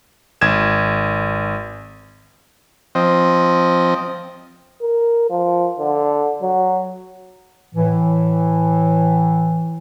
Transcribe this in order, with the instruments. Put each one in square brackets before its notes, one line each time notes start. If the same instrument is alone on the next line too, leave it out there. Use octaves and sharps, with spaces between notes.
[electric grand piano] G#1 G#6 E7
[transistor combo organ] F3 C4 D#5
[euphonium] A#4
F3
D3
F#3
[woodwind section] A2 E3